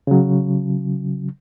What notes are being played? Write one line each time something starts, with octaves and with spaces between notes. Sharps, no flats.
C#3 F#3